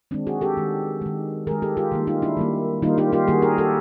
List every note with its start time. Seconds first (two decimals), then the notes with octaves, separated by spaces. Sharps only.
0.11 D#3 G#3 C4 D4
0.27 F#4 G#4
0.41 G4 A4
0.57 D#3 G#3
1.01 D#3 G#3
1.47 D#3 G#3 G#4 A#4
1.62 G4 A4
1.77 F4 G4
1.92 D#3 G3 A#3
2.07 D#4 F4
2.22 D4 E4
2.37 D#3 G3 A#3
2.82 D#3 G3 A#3 D#4 F4
2.98 F4 G4
3.12 F4 G4
3.27 D#3 G3 A#3 F#4 G#4
3.42 G#4 A#4
3.58 G4 A4